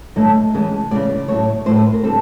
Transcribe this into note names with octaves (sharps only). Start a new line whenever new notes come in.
G2 D3 F#3 A3 D#5
C#3 E3 G#3 B3
C#3 E3 G#3 B3 D5
D5
A2 F#3 A3 C#5
A2 F#3 A3 C5
B4
A#4
D3 G3 C4 A4